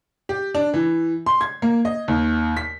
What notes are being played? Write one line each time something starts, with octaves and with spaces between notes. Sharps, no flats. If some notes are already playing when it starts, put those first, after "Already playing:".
G4
D4
E3
C6
G#6
A#3
D#5
D#2
B6